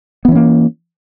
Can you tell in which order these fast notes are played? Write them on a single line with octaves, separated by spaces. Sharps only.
B3 E3 C#4 A#3